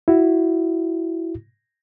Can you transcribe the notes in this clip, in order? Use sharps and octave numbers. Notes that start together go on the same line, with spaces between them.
E4 F#4